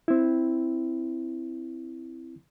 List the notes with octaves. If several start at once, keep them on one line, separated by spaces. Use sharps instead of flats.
C4 E4